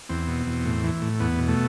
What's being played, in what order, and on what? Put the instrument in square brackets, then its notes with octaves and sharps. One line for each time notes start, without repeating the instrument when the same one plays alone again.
[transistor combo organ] E2 C4
B2
E2
A2
E3
A2
E2 B3
B2
A3